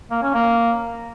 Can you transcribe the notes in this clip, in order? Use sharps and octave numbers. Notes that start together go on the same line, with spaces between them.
A#3
C#4
A#3